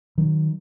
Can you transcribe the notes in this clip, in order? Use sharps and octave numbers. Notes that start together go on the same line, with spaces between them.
D#3 F#3